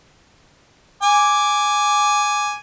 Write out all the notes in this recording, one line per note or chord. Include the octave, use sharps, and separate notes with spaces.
G#5 D6